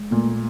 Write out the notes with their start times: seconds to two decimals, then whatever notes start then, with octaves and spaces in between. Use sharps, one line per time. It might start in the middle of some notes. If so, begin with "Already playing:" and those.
Already playing: G#3
0.11 A#2 A3
0.33 A#3